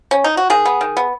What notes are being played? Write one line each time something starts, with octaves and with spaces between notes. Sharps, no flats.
C#4
D#4
F#4
D#3 G#4
B3
D#3
B3